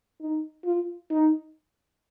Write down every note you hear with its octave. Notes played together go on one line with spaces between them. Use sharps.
D#4
F4
D#4